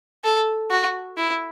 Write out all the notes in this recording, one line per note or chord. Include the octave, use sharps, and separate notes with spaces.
A4
F#4
E4